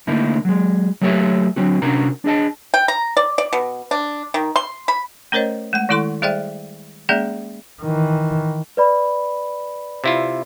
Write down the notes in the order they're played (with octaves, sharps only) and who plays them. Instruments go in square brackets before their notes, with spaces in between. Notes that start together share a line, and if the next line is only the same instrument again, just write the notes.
[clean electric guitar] D3 A3 A#3 D#4 E4
F#3 G#3
F#3 A3 G4 A4 C#5 E5
D3 F#3 C4 F#4
C3 C#4 D4 F#4 A#4 A#5
D4 G#4 D#5 A5
[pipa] G5
A#5
D5
D5
B2
D4
D#3
C6
B5
[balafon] A3 C#4 A#4 C5 C#5 D#5
G#3 A3 F#5
D#3 G#3 E4 A4 C6
G3 G#4 C5 D5 E5 G5
G#3 A#3 C#4 G#4 D5 E5
[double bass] D#3 E3
[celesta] B4 D5 B5
[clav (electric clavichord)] C3 E4 F4